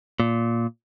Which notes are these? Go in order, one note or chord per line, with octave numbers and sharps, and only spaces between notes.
A#2